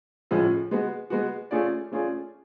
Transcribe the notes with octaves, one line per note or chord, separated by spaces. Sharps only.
A2 F3 G#3 C#4
G#3 B3 F#4
G#3 B3 F#4
A3 C#4 F4 G#4 D5
A3 C#4 F4 G#4 D5